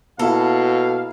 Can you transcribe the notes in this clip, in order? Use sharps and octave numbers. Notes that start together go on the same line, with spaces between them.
B2 A#3 E4 A4 F5